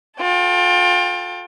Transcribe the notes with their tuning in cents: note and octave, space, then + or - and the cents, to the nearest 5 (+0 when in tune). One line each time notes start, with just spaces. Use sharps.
F4 +35 A4 +0 G5 +20